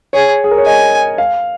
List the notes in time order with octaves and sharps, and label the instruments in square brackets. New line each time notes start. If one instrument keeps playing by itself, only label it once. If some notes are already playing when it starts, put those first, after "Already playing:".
[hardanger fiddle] G#4 [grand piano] C#5
[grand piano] G#4
A#4
C#5
[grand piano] D#5 [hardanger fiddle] G#5
[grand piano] F5